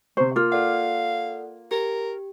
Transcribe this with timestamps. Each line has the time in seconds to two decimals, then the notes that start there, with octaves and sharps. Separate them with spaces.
0.17 C3 C5 C#6
0.36 A#3 F4 D6 F6
0.52 A4 D5 F5 F#5
1.71 G4 A#4